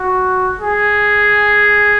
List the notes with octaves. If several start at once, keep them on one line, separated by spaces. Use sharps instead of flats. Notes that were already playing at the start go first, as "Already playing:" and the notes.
Already playing: F#4
G#4